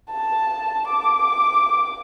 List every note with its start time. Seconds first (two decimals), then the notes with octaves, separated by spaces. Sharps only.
0.11 A5
0.89 D6